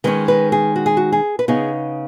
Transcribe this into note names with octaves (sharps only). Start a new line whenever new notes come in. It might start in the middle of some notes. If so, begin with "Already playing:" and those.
D#3 G#3 C#4 B4
B4
G#4
F#4
G#4
F#4
G#4
B4
C#3 B3 D#4 G#4